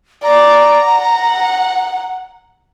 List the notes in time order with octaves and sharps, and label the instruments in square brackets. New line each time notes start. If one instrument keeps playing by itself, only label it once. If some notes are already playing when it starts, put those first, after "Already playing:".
[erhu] D5 [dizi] A#5
[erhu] F#5